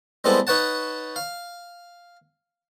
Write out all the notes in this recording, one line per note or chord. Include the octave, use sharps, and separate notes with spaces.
G3 G#3 B3 C4 E4 A4
D#4 B4 C#5 F#5 A5
F5